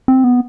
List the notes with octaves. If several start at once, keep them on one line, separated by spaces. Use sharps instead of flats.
C4
B3